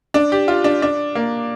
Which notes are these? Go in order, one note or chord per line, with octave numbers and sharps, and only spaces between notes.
D4
G4
F4
D4
D4
A#3